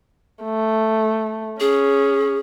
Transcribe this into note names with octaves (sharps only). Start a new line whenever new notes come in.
A3
C#4 G#4